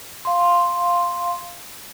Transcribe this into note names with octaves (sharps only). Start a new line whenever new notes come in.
F5 C6